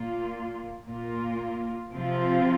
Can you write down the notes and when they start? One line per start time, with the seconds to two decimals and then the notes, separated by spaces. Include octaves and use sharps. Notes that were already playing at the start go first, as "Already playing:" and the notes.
Already playing: A#2 A#3 F4
0.85 A#2 A#3 F4
1.92 C3 F3 C4 F4